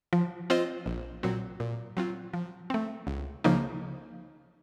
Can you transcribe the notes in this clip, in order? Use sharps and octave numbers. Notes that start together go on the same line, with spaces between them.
F3
C4 F4 C5 D#5
A#1
A#2 F#3 C4 F#4
A#2
F#3 C4 F4
F3
A3 C4
C#2
C#3 F3 A#3 D#4